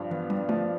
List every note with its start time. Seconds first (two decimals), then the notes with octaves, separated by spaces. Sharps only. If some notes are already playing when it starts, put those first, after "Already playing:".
Already playing: G2 F3
0.11 E3 B3
0.30 G3 D4
0.49 F3 A3